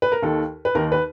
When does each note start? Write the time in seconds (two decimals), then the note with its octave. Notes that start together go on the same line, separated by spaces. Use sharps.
0.02 B4
0.12 A#4
0.22 D#2 D#3 A4
0.65 B4
0.75 D#2 D#3 A#4
0.92 B4